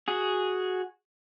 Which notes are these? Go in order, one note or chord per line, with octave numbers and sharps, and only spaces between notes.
F#4 G#4